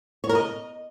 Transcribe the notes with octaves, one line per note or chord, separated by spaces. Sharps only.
C#5
A#4
D#5